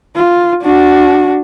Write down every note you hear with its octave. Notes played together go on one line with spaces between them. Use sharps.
F4
D4 F#4